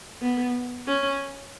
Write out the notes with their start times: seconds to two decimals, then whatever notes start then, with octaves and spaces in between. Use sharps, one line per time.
0.22 B3
0.87 C#4